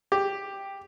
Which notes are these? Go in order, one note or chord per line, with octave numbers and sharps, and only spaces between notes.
G4